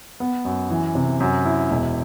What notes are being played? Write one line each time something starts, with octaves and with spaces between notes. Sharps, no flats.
B3
F#2
E3
C3
F#2
E4
E1